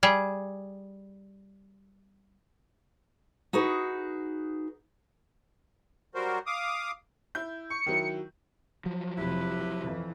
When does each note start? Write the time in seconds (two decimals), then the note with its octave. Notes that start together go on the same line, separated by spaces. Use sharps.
0.03 G3 G#4
3.53 D#4 F#4 G#4 B4
6.15 F#3 G3 F#4 A#4 C5
6.46 F5 D6 D#6
7.35 E4 G6
7.70 C#6 C#7
7.86 D#3 F#3 E4
8.86 F3 F#3
9.18 F1 E4 G4 B4
9.83 F2 E3